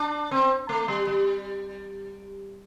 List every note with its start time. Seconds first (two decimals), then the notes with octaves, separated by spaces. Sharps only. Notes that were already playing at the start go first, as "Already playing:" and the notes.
Already playing: D4
0.31 C4
0.69 A3
0.88 G3
1.07 G3